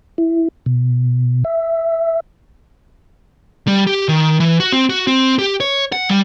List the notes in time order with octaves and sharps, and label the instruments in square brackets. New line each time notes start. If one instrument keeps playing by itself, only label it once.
[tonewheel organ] E4
B2
E5
[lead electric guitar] G3
G4
D#3
E3
F#4
C4
F#4
C4
G4
C#5
F#5
G3